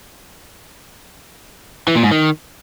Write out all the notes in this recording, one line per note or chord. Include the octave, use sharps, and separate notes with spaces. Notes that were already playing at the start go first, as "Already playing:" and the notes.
E3
A#2
G#2
D#3